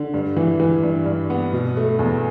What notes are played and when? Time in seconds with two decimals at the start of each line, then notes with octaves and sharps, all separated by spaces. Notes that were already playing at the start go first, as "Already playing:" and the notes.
Already playing: D3
0.14 G2
0.36 E3
0.60 E3
0.83 G2
1.06 G2
1.30 B3
1.53 B2
1.77 A3
1.99 E2